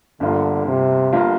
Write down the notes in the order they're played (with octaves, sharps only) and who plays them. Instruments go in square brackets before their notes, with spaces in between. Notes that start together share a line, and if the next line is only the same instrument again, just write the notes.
[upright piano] G1 G2 F3 A#3 F4 [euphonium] D3
[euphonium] C3
[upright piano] G1 G2 F3 A#3 F4